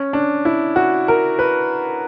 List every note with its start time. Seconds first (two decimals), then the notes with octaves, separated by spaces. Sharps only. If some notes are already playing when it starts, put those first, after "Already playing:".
Already playing: C#4
0.13 D4
0.45 E4
0.76 F#4
1.08 A#4
1.39 B4